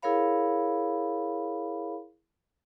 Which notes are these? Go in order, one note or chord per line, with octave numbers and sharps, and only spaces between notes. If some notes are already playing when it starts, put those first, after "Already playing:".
E4 G#4 A#4 C#5 F5 B5